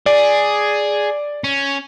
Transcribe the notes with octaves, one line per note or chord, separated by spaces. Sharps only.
G#4 D5
C#4